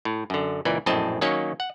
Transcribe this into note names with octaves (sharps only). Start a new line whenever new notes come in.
A2
F#2 D3
C#2 A#2 E3 D5
A#1 F#2 A2 C4 D#5 A5
D#3 F#3 A#3 C#4 C#5
F#5